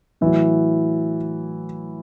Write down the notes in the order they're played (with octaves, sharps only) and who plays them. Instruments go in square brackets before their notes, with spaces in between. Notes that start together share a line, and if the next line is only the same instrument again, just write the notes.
[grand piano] A2 E3 F#3 E4